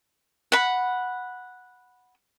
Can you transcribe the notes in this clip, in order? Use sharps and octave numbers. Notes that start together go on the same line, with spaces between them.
F#5 B5